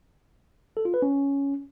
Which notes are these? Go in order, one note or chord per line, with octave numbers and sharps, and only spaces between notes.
A4
F4
B4
C#4